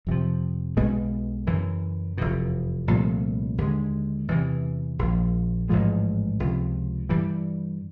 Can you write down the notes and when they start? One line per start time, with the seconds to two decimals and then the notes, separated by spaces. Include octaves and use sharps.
0.07 F2 C3 F3
0.77 B1 B2 G#3 B3
1.47 F#2 C#3 E3
2.18 F1 E2 B2
2.88 C2 A#2 F3 A3
3.58 D#2 D3 F3 G#3
4.28 E2 C3 E3
4.99 A#1 A#2 F3
5.69 A1 G#2 F3 G#3
6.40 C#2 C3 F3
7.09 G2 E3 G3